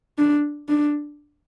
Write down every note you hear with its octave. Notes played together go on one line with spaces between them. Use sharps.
D4
D4